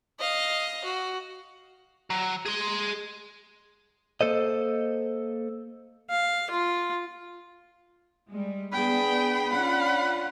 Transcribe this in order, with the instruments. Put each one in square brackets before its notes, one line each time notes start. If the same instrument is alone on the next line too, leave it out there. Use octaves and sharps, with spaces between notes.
[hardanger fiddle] D#5 F5
F#4
[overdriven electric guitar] F#3
G#4 C6
[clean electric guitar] A#3 A4 C5 D#5
[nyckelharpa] F5
F4
[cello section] G3 G#3
[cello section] B3 D4 G#4 [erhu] G5 [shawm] B5
[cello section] C#4 D4 F4 [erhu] F#5